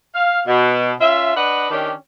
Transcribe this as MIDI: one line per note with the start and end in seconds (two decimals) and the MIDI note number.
0.15 0.41 77
0.47 0.91 47
1.01 1.33 61
1.01 1.33 65
1.01 1.33 76
1.35 1.67 62
1.35 1.67 71
1.35 1.67 75
1.35 1.67 78
1.71 1.93 51
1.71 1.93 61
1.71 1.93 62
1.71 1.93 67